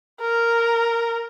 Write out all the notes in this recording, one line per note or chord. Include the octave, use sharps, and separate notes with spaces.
A#4